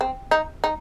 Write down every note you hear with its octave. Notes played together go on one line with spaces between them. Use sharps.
C4
D#4
D#4